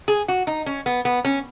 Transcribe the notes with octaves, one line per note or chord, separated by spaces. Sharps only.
G#4
F#4
D#4
C#4
B3
B3
C#4